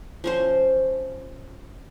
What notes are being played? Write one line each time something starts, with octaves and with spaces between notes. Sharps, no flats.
F3 C#4 C5